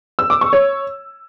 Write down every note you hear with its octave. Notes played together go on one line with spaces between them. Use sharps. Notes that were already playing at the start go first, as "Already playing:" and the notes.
E6
D6
C#6
C#5